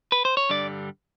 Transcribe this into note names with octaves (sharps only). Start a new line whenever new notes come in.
B4
C5
C#5
G2 D3 G3 D5